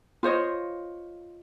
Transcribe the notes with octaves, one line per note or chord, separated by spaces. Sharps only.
F4 C5 C#5 D#5